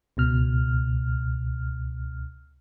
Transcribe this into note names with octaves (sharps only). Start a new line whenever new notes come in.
C#2 B2 F6